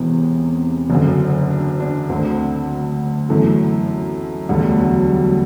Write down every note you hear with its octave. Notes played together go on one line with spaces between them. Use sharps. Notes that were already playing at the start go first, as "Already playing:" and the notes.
Already playing: E1 E2 C3 E3 B3
F#1 F#2 D3
D4
D4
D2 D3 C4
G1 F#2 E3 A3
E1 D2 D3 G3
F#3
G3